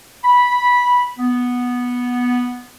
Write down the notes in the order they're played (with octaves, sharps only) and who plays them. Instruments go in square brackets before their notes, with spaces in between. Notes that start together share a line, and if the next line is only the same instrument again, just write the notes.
[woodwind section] B5
B3